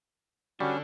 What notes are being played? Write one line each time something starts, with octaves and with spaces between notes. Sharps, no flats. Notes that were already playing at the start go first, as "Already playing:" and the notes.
D3 G3 C#4 D4 F#4